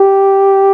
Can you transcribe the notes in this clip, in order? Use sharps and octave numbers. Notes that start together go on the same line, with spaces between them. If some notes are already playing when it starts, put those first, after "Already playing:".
Already playing: G4